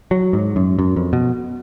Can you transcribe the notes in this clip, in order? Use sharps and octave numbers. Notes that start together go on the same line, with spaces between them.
F#3
G#2
F#2
F#2
F2
B2